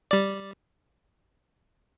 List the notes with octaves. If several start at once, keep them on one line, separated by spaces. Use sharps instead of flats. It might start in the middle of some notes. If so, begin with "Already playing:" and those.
G3 D5